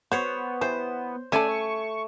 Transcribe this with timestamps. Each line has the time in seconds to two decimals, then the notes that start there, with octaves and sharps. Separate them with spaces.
0.12 B3 F#4 C5 C#5
0.61 E3 G4 C5
1.32 A3 C#4 A4 D5 G#5
1.48 C#6